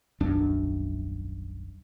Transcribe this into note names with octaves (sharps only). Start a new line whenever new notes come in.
D#1 B1 F#2 D4